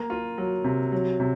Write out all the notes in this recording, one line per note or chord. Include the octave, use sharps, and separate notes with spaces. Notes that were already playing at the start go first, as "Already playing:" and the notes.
Already playing: A#3
F4
F#3
C3
F#3
C3